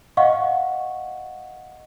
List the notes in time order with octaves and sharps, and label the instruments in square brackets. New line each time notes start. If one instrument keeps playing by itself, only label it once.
[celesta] D#5 F5 F#5 C#6